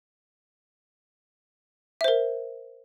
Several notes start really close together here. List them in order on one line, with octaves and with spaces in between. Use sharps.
E5 C5 A#4